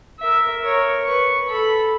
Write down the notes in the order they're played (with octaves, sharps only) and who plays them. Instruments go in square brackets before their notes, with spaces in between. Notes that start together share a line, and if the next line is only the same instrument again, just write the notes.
[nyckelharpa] A#4 E5
A#4 C#5
B4 C#6
A4 B5